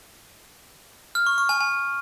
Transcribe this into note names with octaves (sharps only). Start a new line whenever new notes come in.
F6
C#6
C#6
G#5
G#5